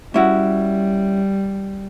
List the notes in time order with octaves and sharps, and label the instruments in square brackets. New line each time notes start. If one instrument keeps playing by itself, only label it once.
[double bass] G3 [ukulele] C#4 E4 F#4